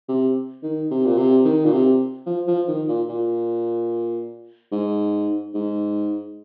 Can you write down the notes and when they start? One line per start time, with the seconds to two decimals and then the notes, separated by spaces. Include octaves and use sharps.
0.09 C3
0.63 D#3
0.91 C3
1.06 A#2
1.18 C3
1.45 D#3
1.65 A#2
1.73 C3
2.26 F3
2.47 F3
2.68 D#3
2.88 A#2
3.09 A#2
4.72 G#2
5.54 G#2